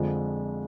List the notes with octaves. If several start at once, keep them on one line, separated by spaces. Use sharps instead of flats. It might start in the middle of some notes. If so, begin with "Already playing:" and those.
Already playing: F2 D3 F3 G#3